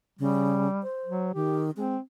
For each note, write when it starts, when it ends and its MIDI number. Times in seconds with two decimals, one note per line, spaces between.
0.19 0.67 49
0.19 0.81 55
0.83 1.33 72
1.05 1.31 54
1.34 1.71 51
1.34 1.66 67
1.77 1.96 56
1.77 2.00 60